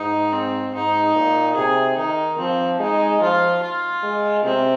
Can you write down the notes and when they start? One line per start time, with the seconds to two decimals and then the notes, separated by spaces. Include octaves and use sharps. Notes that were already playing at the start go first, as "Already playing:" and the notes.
Already playing: G#2 D#4
0.33 C4
0.74 G#2 D#4
1.15 A#2
1.56 C3 G#4
1.97 D#3 D#4
2.38 F3 C4
2.79 G#3 D#4
3.21 F3 F4
3.62 F4
4.03 G#3
4.44 C3 C4